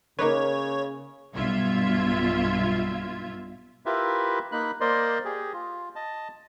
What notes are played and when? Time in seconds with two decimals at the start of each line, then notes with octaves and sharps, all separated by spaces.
0.19 C#3 A#3 D#4 B4 C#5
1.33 B1 G2 B2 F4 E5 G#6
3.86 E4 F4 G4 A#4 B4 E5
4.52 A#3 D#4 B5 F#6
4.81 A#3 A#4 C5 D5 D#5 C6
5.25 G4 G#4
5.53 F4
5.96 D#5 A5